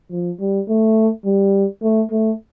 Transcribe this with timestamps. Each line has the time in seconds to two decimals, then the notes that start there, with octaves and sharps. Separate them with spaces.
0.11 F3
0.40 G3
0.68 A3
1.25 G3
1.82 A3
2.11 A3